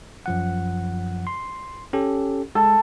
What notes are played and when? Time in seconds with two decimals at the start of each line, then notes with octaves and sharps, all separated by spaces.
0.26 F#2 F3 F#5
1.27 C6
1.93 C#4 G4 A4
2.55 G#3 A4